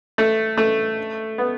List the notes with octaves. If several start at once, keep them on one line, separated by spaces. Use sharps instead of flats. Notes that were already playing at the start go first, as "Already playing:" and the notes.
A3
A3
B3